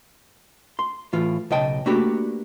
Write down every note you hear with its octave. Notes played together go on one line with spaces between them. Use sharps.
C6
A2 E3 F4
B1 C#3 D#5 G5 A5
A3 A#3 D4 F#4 G4 B4